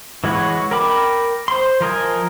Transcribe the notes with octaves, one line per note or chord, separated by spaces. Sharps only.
E3 G#3 F#4 B4 C#5
A#4 G5 B5 D6
C5 C6
F3 A#4 D#5 G#5